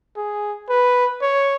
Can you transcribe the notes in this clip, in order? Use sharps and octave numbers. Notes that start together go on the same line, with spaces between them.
G#4
B4
C#5